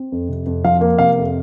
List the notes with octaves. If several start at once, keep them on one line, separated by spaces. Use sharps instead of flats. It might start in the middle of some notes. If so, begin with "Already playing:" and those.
Already playing: C4
F2
C3
F2
F3 F5
A#3
C3 F5
F2